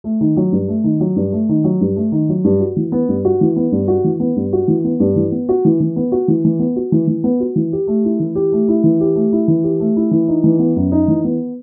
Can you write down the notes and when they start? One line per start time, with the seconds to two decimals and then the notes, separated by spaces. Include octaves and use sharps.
0.04 A3
0.21 D#3
0.37 F#3
0.52 G2
0.68 A3
0.84 D#3
1.00 F#3
1.16 G2
1.32 A3
1.49 D#3
1.64 F#3
1.81 G2
1.96 A3
2.12 D#3
2.29 F#3
2.44 G2
2.60 F#4
2.76 E3
2.92 B3
3.08 G2
3.25 F#4
3.41 E3
3.56 B3
3.72 G2
3.88 F#4
4.04 E3
4.20 B3
4.36 G2
4.53 F#4
4.68 E3
4.84 B3
5.00 G2
5.16 E3
5.32 B3
5.49 F#4
5.65 E3
5.80 E3
5.96 B3
6.12 F#4
6.28 E3
6.45 E3
6.59 B3
6.76 F#4
6.92 E3
7.07 E3
7.24 B3
7.40 F#4
7.56 E3
7.73 G4
7.87 A3
8.05 E4
8.20 E3
8.35 G4
8.52 A3
8.68 E4
8.84 E3
9.00 G4
9.16 A3
9.32 E4
9.48 E3
9.64 G4
9.80 A3
9.96 E4
10.11 E3
10.28 D#4
10.44 E3
10.59 B3
10.76 F#2
10.92 D#4
11.08 E3
11.24 B3